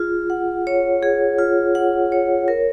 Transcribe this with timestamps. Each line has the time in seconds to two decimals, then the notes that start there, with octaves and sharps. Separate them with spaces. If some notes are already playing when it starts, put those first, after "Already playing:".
Already playing: F4 G#4
0.30 F#5
0.67 C#5
1.03 G#4
1.38 F4
1.75 F#5
2.12 C#5
2.48 A#4